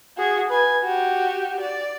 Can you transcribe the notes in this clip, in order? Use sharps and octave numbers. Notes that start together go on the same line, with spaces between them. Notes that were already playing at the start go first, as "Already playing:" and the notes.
F#4 G#4
B4 G#5
F#4 G4
D5